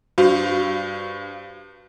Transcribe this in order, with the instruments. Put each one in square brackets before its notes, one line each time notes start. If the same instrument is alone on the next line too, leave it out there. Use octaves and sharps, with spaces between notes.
[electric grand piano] G2 C5 F5 [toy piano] F#4